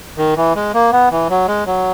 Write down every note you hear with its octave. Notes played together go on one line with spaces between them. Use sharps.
D#3
E3
G#3
A#3
B3
E3
F#3
G#3
F#3